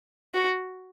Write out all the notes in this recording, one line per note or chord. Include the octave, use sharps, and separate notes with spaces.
F#4